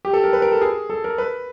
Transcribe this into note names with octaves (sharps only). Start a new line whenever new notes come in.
G4
A4
A#4
B4
A#4
A4
G#4
A4
A#4
B4